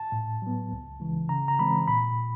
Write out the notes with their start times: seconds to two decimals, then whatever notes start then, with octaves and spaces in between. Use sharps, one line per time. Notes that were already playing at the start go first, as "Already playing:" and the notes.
Already playing: A5
0.12 A2
0.42 F#3 B3
0.72 C#2
1.00 C#3 E3 G#3
1.29 C#3 A#5
1.48 A#5
1.59 E3 G#3 C4 B5
1.88 A#2 B5